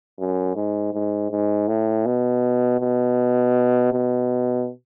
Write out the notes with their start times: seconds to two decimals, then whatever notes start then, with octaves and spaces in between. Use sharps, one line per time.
0.19 F#2
0.56 G#2
0.93 G#2
1.30 G#2
1.68 A2
2.06 B2
2.80 B2
3.92 B2